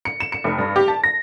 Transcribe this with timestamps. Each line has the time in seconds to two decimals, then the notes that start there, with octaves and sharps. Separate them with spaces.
0.05 C#7
0.20 E7
0.32 C#7
0.44 F1
0.59 G2
0.76 G4
0.88 A5
1.04 A#6